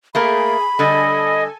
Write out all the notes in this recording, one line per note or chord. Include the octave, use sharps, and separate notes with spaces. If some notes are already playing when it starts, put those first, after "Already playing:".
A3 A#3 G#4 A#4 B5
D3 G3 A4 D#5 G#5